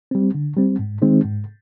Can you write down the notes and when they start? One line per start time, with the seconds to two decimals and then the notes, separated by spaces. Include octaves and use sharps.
0.11 G3 C4
0.34 D3
0.57 G3 C4
0.79 G#2
1.02 D#3 G#3 C4 D#4
1.25 G#2